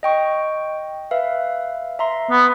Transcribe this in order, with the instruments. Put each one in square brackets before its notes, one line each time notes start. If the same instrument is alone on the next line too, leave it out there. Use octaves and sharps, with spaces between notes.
[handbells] D#5 G5 C#6
B4 E5 F5
E5 A#5 C6
[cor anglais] B3